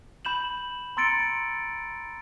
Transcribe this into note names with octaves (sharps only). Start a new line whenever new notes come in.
B5 G6 E7 F#7
A#5 C6 E6 A6 C#7 D7